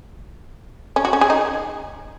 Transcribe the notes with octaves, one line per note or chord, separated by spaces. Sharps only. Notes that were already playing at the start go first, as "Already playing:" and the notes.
C#4
F#4
C#4
G#4
D#4